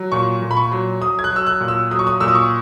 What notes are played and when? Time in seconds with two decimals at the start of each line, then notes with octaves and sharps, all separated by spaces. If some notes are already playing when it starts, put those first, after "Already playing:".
Already playing: F#3
0.12 A#2 C#6
0.42 A#2
0.51 B5
0.57 C#6
0.72 F#3
1.02 F#3 D#6
1.19 G#6
1.24 F#6
1.31 F#3
1.36 E6
1.47 F#6
1.60 A#2
1.68 E6
1.91 F#3 D#6
1.99 C#6
2.07 D#6
2.20 A#2 E6
2.28 D#6
2.35 C#6